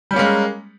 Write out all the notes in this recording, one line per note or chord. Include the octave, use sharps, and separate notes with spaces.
G3 G#3 A#3 C#4